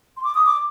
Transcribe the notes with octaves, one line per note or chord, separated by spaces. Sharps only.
C6
D6
D#6
D6